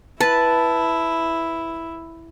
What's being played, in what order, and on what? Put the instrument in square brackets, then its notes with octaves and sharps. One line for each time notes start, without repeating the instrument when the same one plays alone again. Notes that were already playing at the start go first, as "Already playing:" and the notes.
[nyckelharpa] E4 [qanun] B4 [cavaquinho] A5